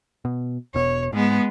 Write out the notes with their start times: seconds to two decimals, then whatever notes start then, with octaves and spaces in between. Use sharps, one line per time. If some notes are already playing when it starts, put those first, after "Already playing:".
0.25 B2
0.74 E1 B2 C#5
1.13 G#2 G#3 B3